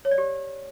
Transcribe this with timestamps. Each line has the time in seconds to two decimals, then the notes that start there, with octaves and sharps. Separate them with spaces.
0.05 C#5
0.11 D5
0.18 G4